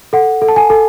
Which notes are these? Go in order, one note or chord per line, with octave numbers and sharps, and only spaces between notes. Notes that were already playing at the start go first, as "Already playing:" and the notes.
A4 F#5
A4
A5
G#5
A4